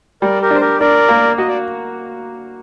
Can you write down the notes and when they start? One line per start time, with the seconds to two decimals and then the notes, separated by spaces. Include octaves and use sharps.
0.22 G3 A#4 D5
0.42 G4 A#4
0.51 D4 C5
0.61 G4 A#4
0.80 D4 A#4 D5
1.09 A#3
1.38 F#4 D#5
1.48 D5